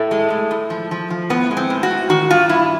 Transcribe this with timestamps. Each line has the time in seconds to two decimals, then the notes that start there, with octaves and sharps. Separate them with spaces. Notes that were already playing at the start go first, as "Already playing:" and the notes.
Already playing: A2 A3
0.11 G#3
0.30 A2
0.51 A2
0.70 F3
0.91 F3
1.10 F3
1.30 A2 B3
1.51 G#3
1.57 C4
1.70 A2
1.83 F#4
1.91 A2
2.09 D#3 F#4
2.30 G2 F4
2.49 G2 E4